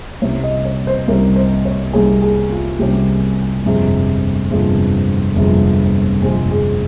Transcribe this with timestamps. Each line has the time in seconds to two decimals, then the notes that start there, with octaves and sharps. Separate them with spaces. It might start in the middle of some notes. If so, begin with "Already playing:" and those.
0.22 C2 C3 G3 C#4 C#5
0.43 D#5
0.65 C#5
0.87 C5
1.08 C2 C3 G3 C#4 A#4
1.36 C5
1.65 C#5
1.93 C2 C3 G3 C#4 G#4
2.22 G#4
2.51 F4
2.79 C2 C3 G3 C#4 G4
3.65 G1 F2 C3 F3 G#3
4.51 G1 F2 C3 F3 G#3
5.36 G1 F2 C3 F3 G#3
6.22 G1 F2 C3 F3 G#3 G#4
6.51 G#4